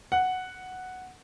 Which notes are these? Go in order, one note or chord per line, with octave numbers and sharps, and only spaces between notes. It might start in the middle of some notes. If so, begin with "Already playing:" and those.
F#5